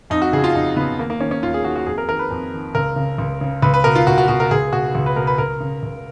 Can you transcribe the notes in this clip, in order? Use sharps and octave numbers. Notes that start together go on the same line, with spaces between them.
F2 D#4
F#4
C#3 G#4
F4
F2 D#4
C#3 B3
D#2 A#3
A#3
D#3 C#4
C#4
D#2 F4
G#4
D#3 F#4
F#4
F2 G#4
A#4
D#3 A#4
B4
F2
D#3
C#2 A#4
C#3
C#2
C#3
C#2 B4
B4
B2 A#4
F4
C#2 F#4
F#4
B2 F#4
A#4
C#2 G#4
B2 F#4
C#2
B4
B2 A#4
B4
C#2 A#4
C#3
C#2